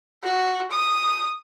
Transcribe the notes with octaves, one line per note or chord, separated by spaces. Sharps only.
F#4
D#6